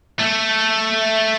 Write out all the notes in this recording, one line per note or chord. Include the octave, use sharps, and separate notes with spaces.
A3